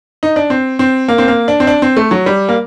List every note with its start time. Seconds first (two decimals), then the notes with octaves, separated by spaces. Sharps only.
0.23 D#4
0.36 D4
0.50 C4
0.79 C4
1.08 A#3
1.18 C4
1.28 A#3
1.48 D4
1.60 C4
1.67 D4
1.82 C4
1.97 A3
2.11 F#3
2.26 G3
2.49 A#3